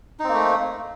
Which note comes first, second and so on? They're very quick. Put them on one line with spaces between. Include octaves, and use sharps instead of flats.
D#4 C4 A#3 A3